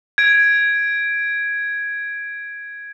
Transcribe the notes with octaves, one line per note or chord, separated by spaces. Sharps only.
G#6 D7